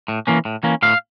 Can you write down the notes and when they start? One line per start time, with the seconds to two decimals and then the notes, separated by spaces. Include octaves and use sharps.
0.08 A2
0.27 E3 A#3 C#4
0.45 A2
0.63 E3 A#3 C#4
0.82 A2 F5